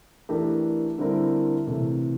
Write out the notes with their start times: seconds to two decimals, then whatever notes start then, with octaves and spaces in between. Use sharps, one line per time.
0.29 E3 A3 D4 G4 A#4
0.98 D3 G3 C4 E4 A#4
1.67 C3 E3 A3